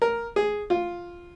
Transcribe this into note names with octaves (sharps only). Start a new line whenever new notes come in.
A#4
G#4
F4